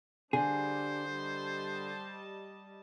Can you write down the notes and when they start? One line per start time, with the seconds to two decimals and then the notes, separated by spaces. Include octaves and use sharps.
0.33 D3 G3 D4 G#4 C5
1.11 G3 D#5 A5